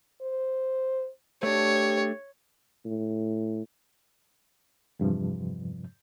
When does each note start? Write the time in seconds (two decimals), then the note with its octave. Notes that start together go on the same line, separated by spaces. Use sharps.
0.22 C5
1.43 A3 D4 G4 C#5
2.85 A2
4.99 E2 G2 C3 F3